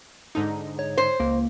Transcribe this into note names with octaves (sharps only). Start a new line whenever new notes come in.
G#2 D3 D#4
C#5
C5
C#2 A#3